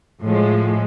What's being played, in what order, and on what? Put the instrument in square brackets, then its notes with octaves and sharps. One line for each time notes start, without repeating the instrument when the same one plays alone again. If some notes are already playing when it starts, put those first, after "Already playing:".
[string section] A2 F3 G#3